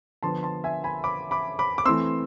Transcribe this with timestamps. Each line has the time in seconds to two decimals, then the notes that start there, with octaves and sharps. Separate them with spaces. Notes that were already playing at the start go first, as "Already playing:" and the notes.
0.23 D3 F3 B3 A5 C6
0.43 A5 C6
0.64 E5 G#5
0.84 G#5 B5
1.04 B5 D6
1.31 B5 D6
1.59 B5 D6
1.78 D6
1.85 E3 A3 C4 C6 E6